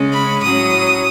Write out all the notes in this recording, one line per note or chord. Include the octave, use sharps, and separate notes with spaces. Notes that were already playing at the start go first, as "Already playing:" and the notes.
Already playing: C#3 G#3 C#4
B5
A2 F#3 C#4 D#6